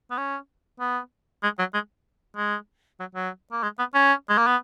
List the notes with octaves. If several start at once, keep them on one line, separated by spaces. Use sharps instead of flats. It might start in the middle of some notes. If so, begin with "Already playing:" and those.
B3
C#4
B3
G#3
F#3
G#3
G#3
F#3
F#3
A#3
G#3
B3
C#4
G#3
A#3
B3